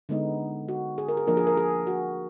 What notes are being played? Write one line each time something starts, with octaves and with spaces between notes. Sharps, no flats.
D3 G#3 B3 D#4
F#4
G#4
A#4
G#4
F3 A#3 D4 A#4
G#4
A#4
G#4
F#4